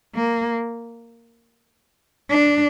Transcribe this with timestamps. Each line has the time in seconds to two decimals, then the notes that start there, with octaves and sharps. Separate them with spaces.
0.15 A#3
2.30 D4